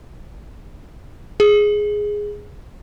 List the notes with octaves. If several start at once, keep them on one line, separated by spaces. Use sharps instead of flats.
G#4